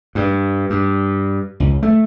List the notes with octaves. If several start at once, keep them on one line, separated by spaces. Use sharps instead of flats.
G2
G2
C#2
A3